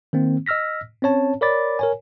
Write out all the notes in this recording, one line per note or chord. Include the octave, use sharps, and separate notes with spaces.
D#3 A#3 C4
D#5 E6 F6 A#6 B6
C4 C#4 C#5 A5
A#4 C#5 D5 B5 D6 A6
A#4 C#5 G#5